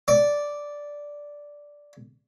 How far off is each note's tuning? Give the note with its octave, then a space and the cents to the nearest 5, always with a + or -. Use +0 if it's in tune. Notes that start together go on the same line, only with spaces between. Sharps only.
D5 -5